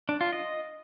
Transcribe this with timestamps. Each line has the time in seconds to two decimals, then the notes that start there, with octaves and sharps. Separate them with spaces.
0.09 D4
0.21 F4
0.33 D#5